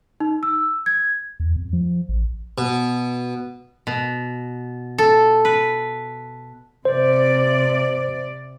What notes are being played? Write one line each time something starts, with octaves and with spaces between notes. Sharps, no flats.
D#4
E6
G#6
E2
F2
F3
A1
B2
B2
A4
B4
C3 C5 D5